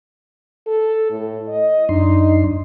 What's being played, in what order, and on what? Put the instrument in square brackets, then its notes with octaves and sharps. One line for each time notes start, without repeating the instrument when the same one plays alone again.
[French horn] A4
A2
D#5
[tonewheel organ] F#2 D4 C6 [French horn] D#4